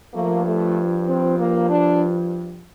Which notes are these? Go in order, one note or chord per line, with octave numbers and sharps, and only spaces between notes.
G2 F3 A3 A#3
A3
C4
A#3
D4